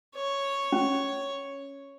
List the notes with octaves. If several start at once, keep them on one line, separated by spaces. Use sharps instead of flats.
C#5
C#4